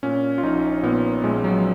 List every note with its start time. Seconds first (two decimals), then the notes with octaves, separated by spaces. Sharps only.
0.03 A#2 C#4
0.38 F4
0.43 A#1 D#4
0.83 A#2 B3
1.24 A#1 G#3
1.44 F#3